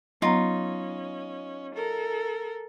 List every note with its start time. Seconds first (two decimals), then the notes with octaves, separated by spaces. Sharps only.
0.22 F#3 B3 C#4 D#4 F4 A#5
1.75 A4 A#4